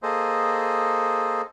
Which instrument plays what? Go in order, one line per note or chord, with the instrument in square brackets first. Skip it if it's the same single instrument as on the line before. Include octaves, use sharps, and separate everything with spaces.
[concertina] A#3 G#4 A4 C5 D#5